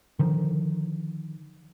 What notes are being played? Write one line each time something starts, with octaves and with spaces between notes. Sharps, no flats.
D3 D#3 F3